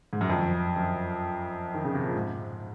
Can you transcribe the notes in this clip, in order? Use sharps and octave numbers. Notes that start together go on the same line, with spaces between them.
G#2
F#2
F2
F#2
D#3
C#3
C3
A#2
G#2